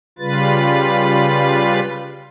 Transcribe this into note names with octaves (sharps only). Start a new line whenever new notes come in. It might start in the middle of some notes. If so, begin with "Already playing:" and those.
C#3 G3 F4 B4 A6